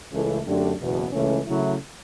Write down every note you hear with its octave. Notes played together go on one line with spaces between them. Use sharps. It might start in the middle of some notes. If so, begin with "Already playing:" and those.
C#2 C#3 E3 A3
F#2 D3 A3 D4 G4
F#1 E2 B2
C#2 C#3 E3 A3 C#4
C#3 F#3 A3 E4